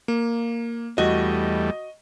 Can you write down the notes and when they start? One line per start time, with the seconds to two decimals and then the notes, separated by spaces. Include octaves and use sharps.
0.08 A#3
0.98 E2 G3 A3 F#4 D#5